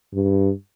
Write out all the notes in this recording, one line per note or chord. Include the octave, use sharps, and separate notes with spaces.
G2